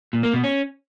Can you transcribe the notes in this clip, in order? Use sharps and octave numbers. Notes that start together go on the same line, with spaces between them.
A#2
A#3
B2
C#4